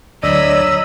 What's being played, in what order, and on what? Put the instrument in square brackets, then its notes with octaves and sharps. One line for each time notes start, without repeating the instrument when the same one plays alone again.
[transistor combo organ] D2 D5 [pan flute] F#3 [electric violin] D#5 B5 [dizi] E6